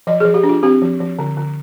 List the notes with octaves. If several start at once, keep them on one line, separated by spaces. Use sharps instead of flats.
F3 D#5
F3 G#4
G4
D4
F4
C4 G4
F3
F3
D3
D3